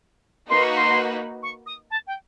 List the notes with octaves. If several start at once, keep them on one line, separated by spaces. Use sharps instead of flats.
A#3 D#4 F#4 B4 C6
C#6
C6
C#6
D#6
A5
G5